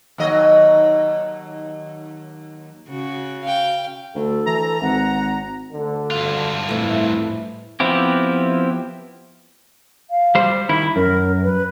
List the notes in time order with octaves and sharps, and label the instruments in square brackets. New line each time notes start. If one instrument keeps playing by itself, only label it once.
[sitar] D#2 F#3 D#5
[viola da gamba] C#3 F#4
[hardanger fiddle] F5 G5
[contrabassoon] D2 [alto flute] A4
[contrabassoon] E3 [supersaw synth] A#5
[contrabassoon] G#1 [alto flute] F#5
[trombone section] D2 D3
[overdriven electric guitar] G2 F4
[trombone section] C2 F2 E4 [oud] A2 E3
[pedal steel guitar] F3 B3 C4 E4 G4
[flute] F5
[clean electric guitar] G3 C5
[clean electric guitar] D#3 E4 [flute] B5
[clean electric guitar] F#2 [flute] A#4
[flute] B4